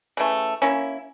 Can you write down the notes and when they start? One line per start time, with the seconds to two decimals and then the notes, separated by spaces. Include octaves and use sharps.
0.17 C#3 E3 A3
0.62 A#3 C#4 E4